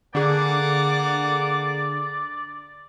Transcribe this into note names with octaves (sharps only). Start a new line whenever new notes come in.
D3 A#3 G#4 D5 F#5 D6